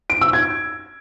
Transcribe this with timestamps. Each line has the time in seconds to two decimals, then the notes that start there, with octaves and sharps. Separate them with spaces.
0.10 D7
0.21 E6
0.33 G#6